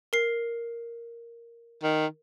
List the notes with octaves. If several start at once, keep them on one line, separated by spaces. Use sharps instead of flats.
A#4 C7
D#3